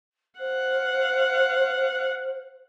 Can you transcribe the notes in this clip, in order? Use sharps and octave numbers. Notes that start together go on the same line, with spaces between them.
C5 F5 F#5